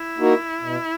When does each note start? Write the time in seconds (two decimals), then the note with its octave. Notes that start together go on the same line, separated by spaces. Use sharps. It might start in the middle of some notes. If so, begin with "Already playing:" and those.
Already playing: E4
0.18 A#3 D#4 F#4 A#4
0.61 B2